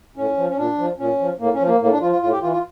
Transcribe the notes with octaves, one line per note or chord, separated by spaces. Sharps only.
A2 C#4
F3
C#4
A#2 D4
F3
A#2 C#4
F3
A2 A#3
C#4
F3
A#3
A2 A#3
D4
F3 F4
F4
A2 F4
G4
E3 F4
F4